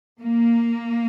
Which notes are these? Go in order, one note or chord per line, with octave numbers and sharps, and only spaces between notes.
A#3